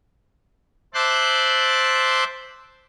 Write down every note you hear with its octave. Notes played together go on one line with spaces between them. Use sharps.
C5 E5 A5 C6 D6 F#6